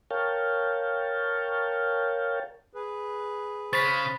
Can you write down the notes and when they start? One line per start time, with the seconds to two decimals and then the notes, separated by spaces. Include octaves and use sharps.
0.11 A#4 C#5 F5 G5 A5
2.73 G#4 B4
3.73 C#3 C5 B5 A6 B6